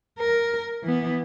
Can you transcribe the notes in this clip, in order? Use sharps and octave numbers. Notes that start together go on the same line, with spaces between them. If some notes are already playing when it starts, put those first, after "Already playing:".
A#4
E3 B3